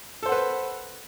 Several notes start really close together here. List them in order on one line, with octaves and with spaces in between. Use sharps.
A4 C5 F#5 B4